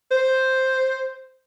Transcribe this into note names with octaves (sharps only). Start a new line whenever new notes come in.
C5